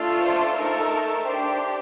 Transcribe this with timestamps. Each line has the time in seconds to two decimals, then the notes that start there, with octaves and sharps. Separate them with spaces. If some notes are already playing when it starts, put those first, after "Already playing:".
Already playing: A3 D4 F4 A4
0.20 C5
0.56 A3 D#4 A4 A#4
1.27 D4 G4 C5